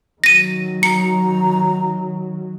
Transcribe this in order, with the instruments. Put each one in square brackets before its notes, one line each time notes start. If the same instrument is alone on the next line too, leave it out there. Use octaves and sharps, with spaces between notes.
[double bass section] D#3 F#3 [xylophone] A#6 D#7
[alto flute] A#5 [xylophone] C#7